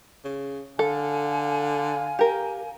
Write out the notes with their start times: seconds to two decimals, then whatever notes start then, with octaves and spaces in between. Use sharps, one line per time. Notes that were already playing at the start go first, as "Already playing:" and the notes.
0.25 C#3
0.79 D3 A4 F5 G#5
2.19 G4 A#4